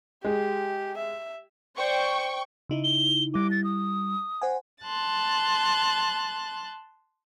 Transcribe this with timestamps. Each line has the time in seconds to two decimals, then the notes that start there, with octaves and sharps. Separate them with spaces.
0.25 G#3 G4
0.97 E5
1.76 C5 D5 G5 C#6
2.69 C#3 D#4 E4
2.84 G7
3.34 G3 E4 D6
3.51 A6
3.64 D#6
4.42 C5 F#5 G#5
4.84 A5 C6 F#6 A6